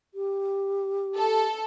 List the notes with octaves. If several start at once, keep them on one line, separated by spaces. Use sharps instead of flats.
G4
A4